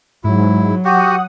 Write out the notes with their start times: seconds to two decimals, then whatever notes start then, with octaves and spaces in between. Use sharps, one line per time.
0.24 G#2 F#3 E4
0.85 F#4 G4 F#5 D#6